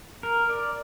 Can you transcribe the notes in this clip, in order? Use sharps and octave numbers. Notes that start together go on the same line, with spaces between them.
A#4
D5